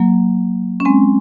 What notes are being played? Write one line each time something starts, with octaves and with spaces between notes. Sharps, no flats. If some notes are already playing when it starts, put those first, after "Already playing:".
Already playing: F#3 A#3
C#4
G#3 C4